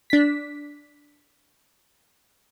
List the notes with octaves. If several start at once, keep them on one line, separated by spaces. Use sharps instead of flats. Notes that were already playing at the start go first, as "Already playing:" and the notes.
D4 B6